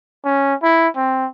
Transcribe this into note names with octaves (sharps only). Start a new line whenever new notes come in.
C#4
E4
C4